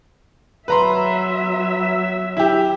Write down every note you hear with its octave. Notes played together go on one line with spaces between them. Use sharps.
F#3 B4 E5 A#5 C6
E4 G4